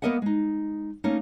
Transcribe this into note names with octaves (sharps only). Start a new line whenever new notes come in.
A#3 B3 A#4 D#5 E5 F#5
G#3 D#4
A3 A#3 C#4 D#4